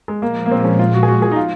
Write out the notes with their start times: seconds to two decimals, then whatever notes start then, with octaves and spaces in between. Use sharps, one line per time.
0.08 G#3
0.22 A#2 F3 G#3 A#3
0.46 A#3
0.51 C4
0.65 C#4
0.79 F4
0.94 F#4
1.03 G#4
1.08 F#4
1.22 G#4
1.31 D#4
1.36 F4